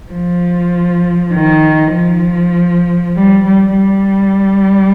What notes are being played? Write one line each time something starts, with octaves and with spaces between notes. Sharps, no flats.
F3
D#3
F3
G3
G3
G3